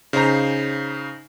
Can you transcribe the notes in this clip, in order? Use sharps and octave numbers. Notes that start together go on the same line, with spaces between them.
C#3 D#4 C5 A#5